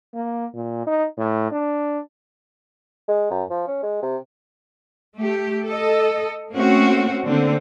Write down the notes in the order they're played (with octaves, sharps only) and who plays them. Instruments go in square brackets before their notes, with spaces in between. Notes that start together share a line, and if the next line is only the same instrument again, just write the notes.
[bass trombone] A#3
A#2
D#4
A2
D4
[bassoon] G#3
F#2
F3
C#4
G#3
C3
[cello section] A3 G4
A4 D#5
A3 A#3 C4 C#4 F#4
D3 A#3 C4